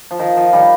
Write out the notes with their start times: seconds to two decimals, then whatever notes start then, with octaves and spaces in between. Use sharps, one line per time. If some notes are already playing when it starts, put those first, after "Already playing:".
0.11 F3
0.19 D#3
0.37 F3
0.53 D#3 G3